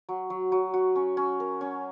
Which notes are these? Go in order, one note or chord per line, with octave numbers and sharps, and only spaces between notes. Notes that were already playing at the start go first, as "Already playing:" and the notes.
F#3
F#3
F#3
F#4
C#4
C#4
A#4
C#4